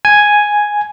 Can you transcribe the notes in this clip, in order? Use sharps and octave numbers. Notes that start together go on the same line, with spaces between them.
G#5